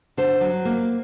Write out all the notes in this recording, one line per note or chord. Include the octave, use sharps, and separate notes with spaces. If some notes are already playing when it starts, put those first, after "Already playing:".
D3 C5
F#3
A#3